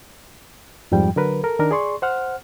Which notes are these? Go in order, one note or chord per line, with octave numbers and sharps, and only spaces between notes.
F2 G#2 F3 G3 G5
D3 F#3 A#4 B4
A4 A#4
D#3 D4 A#4
G#4 D5 C6 C#6
C5 F#5 F6